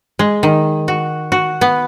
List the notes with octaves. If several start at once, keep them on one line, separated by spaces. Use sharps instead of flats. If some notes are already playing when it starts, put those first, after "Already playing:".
G#3
D#3
F#4
F#4
B3